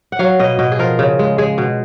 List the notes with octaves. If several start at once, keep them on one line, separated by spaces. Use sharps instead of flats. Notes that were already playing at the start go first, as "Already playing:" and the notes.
F#5
F#3 F5
B2 D#5
B2 D#5
G#4
F3 A#4
C#3
G#3
G#3 G#4
B2